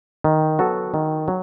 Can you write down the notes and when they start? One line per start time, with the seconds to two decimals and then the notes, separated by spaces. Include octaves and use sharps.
0.24 D#3
0.59 F#3 B3 F#4 A4
0.94 D#3
1.28 F#3